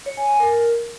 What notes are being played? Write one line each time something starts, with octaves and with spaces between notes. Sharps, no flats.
C#5
G#5
G#5
A#4